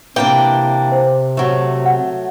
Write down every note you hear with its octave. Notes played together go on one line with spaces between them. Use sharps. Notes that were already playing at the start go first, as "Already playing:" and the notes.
C3 E3 A#3 D4 G5
C5
F#3 A3
F#5